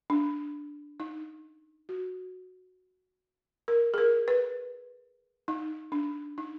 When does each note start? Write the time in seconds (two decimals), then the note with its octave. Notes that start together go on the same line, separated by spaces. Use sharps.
0.10 D4
1.00 D#4
1.89 F#4
3.68 A#4
3.94 G#4
3.98 A#4
4.28 B4
5.48 D#4
5.92 D4
6.38 D#4